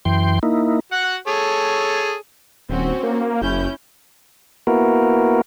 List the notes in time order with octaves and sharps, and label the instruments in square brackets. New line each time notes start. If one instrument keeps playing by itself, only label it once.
[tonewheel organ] F#2 E3 G5 C6
A#3 D#4 E4
[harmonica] F#4 F#5
G#4 A4 C#5
[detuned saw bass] D#1 [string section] C4 C#4 F#4
[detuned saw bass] A#3
[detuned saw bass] F#1 [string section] C#4 E4 G6
[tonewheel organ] A#3 B3 E4 F#4 A#4